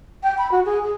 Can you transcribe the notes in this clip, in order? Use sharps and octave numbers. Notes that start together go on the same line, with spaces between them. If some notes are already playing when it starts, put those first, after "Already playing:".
G5
B5
F#4
G#4
G#4